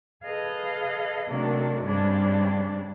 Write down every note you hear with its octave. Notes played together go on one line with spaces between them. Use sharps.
G#4 A4 B4 D#5 F5
C3 D#3 F#3 A3 A#3 D4
G2 C#3 G3 G#3 C4 D4